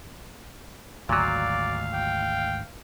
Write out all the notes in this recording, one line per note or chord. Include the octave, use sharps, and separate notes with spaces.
G#1 D2 A#2 F#3 D5 F5
G5